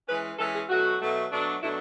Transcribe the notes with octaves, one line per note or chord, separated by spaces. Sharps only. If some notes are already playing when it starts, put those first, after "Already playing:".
E3 G#3 C#4 B4
E3 G#3 C#4 A4
G#4
B2 F#3 A3 F#4
B2 F#3 A3
B2 F#3 A3 D4
B2 F#3 A3 D4 E4